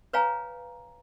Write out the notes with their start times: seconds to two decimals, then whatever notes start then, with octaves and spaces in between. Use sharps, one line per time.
0.13 B4 C#5 F5 G#5 A#5